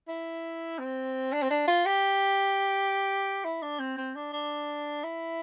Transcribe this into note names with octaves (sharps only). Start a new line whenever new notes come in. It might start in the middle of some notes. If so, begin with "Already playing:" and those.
E4
C4
D4
C4
D4
F4
G4
E4
D4
C4
C4
D4
D4
E4